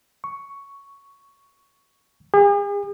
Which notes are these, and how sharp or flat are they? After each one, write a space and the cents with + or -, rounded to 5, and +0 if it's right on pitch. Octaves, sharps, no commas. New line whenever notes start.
C#6 +5
G#4 -45